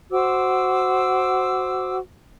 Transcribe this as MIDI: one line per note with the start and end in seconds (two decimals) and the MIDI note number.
0.11 1.98 66
0.11 1.98 72
0.11 1.98 86
0.11 1.98 88